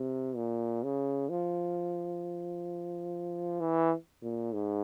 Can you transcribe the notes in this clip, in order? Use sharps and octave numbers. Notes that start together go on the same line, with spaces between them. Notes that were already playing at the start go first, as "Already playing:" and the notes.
Already playing: C3
A#2
C#3
F3
E3
A#2
G#2